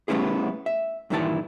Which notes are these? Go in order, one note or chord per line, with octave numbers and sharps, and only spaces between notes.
G3 A3 B3 C#4 E4 G#4
E5
G2 A#2 D#3 E3 E4 A5